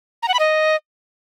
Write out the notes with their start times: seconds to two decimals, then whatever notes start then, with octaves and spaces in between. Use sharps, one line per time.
0.23 A#5
0.28 F#5
0.34 B5
0.39 D#5